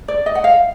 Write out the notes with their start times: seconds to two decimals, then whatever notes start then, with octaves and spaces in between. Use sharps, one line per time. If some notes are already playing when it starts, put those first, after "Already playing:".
0.08 D5
0.26 D#5
0.35 F#5
0.44 F5